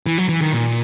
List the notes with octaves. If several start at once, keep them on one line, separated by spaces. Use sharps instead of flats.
E3
F#3
E3
D#3
A#2